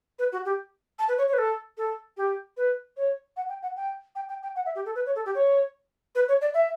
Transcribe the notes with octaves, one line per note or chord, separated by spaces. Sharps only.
B4
F#4
G4
A5
B4
C#5
C#5
B4
A4
A4
G4
B4
C#5
F#5
G5
F#5
G5
G5
G5
G5
F#5
E5
G4
A4
B4
C#5
A4
G4
C#5
B4
C#5
D5
E5